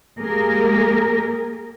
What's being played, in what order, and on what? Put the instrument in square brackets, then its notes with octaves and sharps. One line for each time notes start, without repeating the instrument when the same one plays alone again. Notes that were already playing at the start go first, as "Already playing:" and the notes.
[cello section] G#3 A#3 G4 G#4 A#4